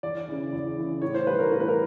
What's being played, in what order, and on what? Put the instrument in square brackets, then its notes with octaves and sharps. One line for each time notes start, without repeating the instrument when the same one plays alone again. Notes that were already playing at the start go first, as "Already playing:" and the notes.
[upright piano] E2 D5
C#3 E3
E2
C#3 E3
A2 C#5
C5
E3 G3 B4
A#4
A2 A#4
B4
A#4